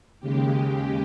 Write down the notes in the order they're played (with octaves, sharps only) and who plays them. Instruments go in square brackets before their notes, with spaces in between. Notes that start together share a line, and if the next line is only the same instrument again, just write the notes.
[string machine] D#2 C#3 G#3 G4